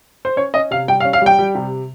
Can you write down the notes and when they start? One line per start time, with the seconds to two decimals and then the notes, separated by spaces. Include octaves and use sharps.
0.25 C5
0.37 C#4 C#5
0.54 C#4 D#5
0.71 C3 F5
0.88 G3 G5
1.00 F5
1.05 C#4
1.13 F5
1.22 G3 G5
1.39 G3
1.55 C3